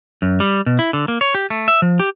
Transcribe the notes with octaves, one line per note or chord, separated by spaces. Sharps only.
F#2
G3
B2
E4
D3
A#3
C#5
G4
A3
E5
F3
G4